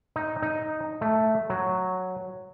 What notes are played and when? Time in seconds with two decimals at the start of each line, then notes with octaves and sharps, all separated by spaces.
0.16 D#4
0.42 D#4
1.01 A3
1.50 F#3